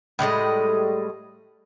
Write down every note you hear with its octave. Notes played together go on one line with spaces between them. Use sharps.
A2 G3 G#3 D#5